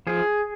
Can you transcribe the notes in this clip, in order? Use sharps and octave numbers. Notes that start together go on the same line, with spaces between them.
F3 G#4